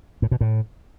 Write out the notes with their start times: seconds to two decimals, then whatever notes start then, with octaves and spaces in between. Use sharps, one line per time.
0.22 A2
0.31 B2
0.41 A2